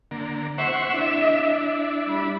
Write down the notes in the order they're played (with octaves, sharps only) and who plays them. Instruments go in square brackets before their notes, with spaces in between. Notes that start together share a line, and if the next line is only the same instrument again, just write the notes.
[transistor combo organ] D3 A#3
[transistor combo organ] C5 F#5 C#6 [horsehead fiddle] E5
[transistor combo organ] D4 E4
[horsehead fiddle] G3 B5